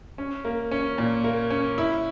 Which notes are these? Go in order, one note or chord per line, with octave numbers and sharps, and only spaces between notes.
C#4
A#3
C#4
A#2
A#3
C#4
E4